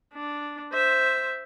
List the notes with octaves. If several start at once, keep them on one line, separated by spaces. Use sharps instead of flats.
D4
C5 E5